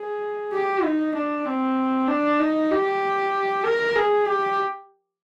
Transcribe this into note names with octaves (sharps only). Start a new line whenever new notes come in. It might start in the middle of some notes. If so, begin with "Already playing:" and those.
Already playing: G#4
G4
D#4
D4
C4
D4
D#4
G4
A#4
G#4
G4